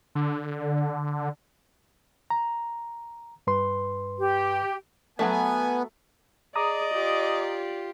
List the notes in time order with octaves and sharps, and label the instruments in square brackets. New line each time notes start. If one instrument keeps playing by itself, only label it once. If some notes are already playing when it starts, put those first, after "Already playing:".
[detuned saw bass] D3
[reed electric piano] A#5
G2 B4 C6
[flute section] G4
[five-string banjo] F#3 G#3 A3 [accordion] B3 [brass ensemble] G#5
[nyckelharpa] G#4 [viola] D5 [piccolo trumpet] D#5 [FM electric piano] A#5 D6 D#6
[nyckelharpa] F4 G4